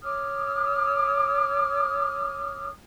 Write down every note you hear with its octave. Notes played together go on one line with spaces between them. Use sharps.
C#5 D6 D#6 F6